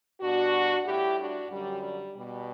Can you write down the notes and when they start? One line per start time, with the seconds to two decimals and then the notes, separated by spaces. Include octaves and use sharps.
0.21 B2 G3 D4 F#4
0.86 A2 G3 E4 G4
1.18 D4 F#4
1.50 F#2 D3 F#3 G3
1.83 G3
2.16 B2 G3